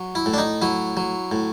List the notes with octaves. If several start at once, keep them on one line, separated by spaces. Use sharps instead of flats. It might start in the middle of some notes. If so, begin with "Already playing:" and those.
Already playing: F#3
E4
A2
D4
D#4
F#3 E4
F#3
A2